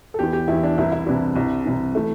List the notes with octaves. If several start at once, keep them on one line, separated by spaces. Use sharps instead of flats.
A4
E2 E3 G4
G4
E2 E4
E3
D4
C2 C3 E3 E4
E4
C2 C3 E3 D4
C2 C3 E3
C2 C3 E3
E3 A3